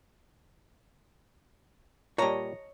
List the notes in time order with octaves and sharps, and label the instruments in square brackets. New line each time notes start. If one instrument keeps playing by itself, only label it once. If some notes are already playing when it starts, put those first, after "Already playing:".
[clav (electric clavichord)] A#2 G3 [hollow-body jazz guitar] C#5 D#5 [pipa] A5 A#5